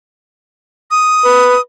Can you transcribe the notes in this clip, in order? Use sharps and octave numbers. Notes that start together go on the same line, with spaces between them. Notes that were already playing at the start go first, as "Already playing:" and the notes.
D#6
B4